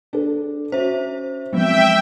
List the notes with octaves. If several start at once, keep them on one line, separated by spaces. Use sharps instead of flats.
D4 A4
C#4 F#4 C5 E5
F3 F#3 G#3 B3 C4 E5 G5